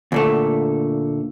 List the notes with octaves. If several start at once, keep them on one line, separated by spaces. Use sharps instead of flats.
D2 A#2 A3